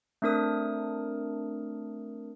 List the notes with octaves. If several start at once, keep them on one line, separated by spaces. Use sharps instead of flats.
A3 C4 D4 A#4 D#6